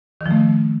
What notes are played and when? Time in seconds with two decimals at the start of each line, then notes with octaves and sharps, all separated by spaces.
0.21 D#3
0.26 F3
0.31 A3